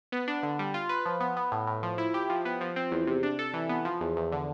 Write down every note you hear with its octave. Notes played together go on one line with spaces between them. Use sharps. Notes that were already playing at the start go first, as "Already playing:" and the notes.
B3
D4
D3
G3
F4
B4
F3
B3
B3
A2
A2
F3
E4
G4
F3
B3
F3
C4
E2
C3
D4
A4
E3
B3
F3
E2
E2
D3